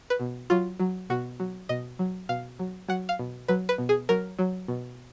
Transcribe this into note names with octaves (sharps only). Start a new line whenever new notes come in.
B4
B2
F#3 F4
F#3
B2 F#4
F#3
B2 D#5
F#3
B2 F5
F#3
F#3 F#5
F5
B2
F#3 B4
B4
B2
G#4
F#3 A#4
F#3
B2